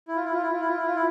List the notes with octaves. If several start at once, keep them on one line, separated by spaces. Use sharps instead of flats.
E4
F4
E4
F4
E4
F4
E4
F4
E4
F4
E4